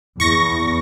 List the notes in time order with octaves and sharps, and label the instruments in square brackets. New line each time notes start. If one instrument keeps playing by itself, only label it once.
[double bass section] E2 [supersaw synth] C#6 A#6